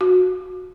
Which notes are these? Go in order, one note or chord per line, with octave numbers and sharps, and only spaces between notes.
F#4